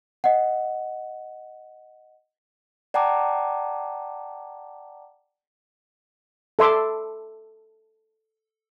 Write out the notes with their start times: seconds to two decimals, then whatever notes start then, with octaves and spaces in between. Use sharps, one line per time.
0.24 D#5 F#5
2.94 D5 F#5 G5 A5 A#5 D6
6.59 A4 E5 C6 D6